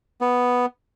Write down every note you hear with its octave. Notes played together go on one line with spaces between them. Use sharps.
B3